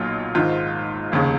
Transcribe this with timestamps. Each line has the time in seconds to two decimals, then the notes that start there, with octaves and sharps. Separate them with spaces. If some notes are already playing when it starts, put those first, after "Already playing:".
Already playing: B1 A#2 F#3 F4
0.35 G#1 G#2 D#3 F4
1.12 F1 D#2 C#3